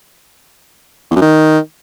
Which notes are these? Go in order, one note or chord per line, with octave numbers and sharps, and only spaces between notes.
E2
F#2
D#3